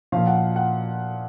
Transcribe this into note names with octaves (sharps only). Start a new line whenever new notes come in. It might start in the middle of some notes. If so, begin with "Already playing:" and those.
A#2 F3 F5
F#5
F5
F#5